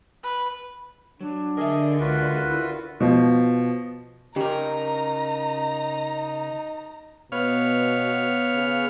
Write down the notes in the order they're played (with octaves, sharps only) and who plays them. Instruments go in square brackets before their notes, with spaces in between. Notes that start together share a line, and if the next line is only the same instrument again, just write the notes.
[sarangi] B4
[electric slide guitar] F#3 [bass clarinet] D4
[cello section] D3 [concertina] G#4 D#5 [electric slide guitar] A#4 E5
[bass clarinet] C#2 [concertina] F4 F#4 B4
[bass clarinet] E4
[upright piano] B2 F3
[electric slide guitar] C#3 A#4 [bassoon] D#4 [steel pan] G4 [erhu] A#5
[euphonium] B2 [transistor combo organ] B3 C#5 F5
[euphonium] C#3